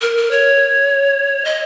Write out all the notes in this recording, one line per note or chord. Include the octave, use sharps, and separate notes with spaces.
A#4
A#4
C#5
D#5